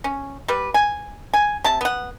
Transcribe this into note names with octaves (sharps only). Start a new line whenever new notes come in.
C#4
G3 B4
G#5
G#5
C3 A5
B3 F#5